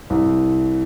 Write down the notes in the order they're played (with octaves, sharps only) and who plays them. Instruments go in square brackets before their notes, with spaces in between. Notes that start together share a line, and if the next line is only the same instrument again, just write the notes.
[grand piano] C2